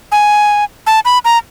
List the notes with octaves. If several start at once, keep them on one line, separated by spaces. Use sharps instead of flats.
G#5
A5
B5
A#5